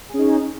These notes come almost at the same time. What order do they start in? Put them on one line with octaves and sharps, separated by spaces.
G#4 C#4 D#4